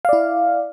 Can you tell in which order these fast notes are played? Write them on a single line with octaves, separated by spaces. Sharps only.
F5 D5 E4